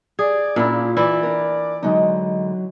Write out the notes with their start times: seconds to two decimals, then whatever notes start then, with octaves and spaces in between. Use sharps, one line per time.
0.19 G#4 D5
0.56 A#2 A#3 C#4 D4 E4
0.72 F4
0.97 E3 E4 F4 D5 G#5
1.23 D4 A#4
1.83 D3 F#3 G#3 D#4